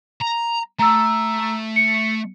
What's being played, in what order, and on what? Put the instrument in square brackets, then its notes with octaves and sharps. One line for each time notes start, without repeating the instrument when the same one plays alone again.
[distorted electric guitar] A#5
[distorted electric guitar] A3 [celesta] A#5 E6
[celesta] C#7